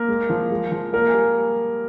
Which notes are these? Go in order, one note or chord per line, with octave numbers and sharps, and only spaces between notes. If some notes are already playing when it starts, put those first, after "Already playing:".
Already playing: A#3 A#4
G#3
F3
G#3
F3
A#3 A#4
G#5
G3